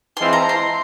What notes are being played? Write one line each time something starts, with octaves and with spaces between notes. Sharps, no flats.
E3 G#3 C4 F4 C6
A#5
C6